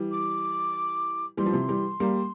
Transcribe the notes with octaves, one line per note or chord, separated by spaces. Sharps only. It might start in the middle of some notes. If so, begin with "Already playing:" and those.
Already playing: E3 G3
D6
E3 G3 C6
F3
C3 E3
E3 G3
G3 A#3